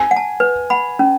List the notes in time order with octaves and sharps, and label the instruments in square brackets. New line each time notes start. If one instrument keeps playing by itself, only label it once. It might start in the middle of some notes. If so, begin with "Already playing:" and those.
Already playing: [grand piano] G#5
[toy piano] F#5
A5
B4
F#5 B5
C#4